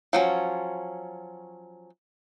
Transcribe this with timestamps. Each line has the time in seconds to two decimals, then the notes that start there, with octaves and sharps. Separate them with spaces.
0.13 F3 F#3 C#4